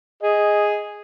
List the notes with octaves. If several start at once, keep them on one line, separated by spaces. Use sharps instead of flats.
G#4 D#5